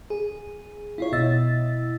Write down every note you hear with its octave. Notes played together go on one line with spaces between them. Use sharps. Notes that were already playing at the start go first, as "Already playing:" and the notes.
G#4
E4 F4 C#5
B2 E4 D#5 E6 A6